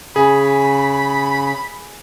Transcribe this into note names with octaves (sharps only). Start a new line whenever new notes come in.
C#3 G#4 B5